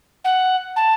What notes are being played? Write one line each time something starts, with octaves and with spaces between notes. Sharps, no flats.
F#5
A5